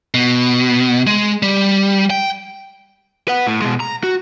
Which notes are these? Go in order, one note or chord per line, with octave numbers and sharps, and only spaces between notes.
B2
G#3
G3
G5
B4 F#5
A2
B2 G#3
A#5
F#4